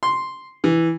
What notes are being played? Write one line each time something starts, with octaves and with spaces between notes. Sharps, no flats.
C6
E3